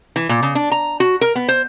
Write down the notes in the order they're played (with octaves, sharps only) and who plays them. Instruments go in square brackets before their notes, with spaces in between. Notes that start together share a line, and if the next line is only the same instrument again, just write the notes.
[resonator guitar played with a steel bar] E3
A#2
C#3
D4
A#5
F#4
A#4
B3
C5